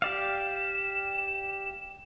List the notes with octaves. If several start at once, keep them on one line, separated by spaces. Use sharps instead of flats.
G4 D5 F5 E7